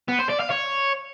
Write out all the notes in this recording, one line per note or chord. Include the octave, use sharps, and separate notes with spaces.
B3
C5
D5
F5
C#5